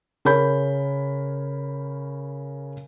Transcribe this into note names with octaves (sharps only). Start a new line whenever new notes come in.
C#3 A#4 C#5 B5 G6